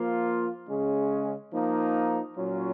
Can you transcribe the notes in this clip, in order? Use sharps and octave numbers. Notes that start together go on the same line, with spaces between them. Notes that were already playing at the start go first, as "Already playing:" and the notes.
Already playing: F3 A#3 F4
C#3 G#3 C#4
F3 A#3 D#4
A#2 F#3 C#4 F4